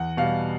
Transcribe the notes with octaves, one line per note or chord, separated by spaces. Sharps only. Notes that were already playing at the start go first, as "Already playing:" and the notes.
Already playing: E2 F#5
B2 G3 F5